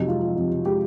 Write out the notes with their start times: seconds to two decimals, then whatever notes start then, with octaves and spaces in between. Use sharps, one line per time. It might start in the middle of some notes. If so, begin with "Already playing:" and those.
Already playing: F2 C3 F#3 D#4
0.08 G#3 F4
0.23 F3
0.37 F2
0.51 C3
0.65 G#3 G4